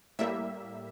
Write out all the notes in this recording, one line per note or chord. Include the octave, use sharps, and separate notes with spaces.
A2 G3 A#3 E5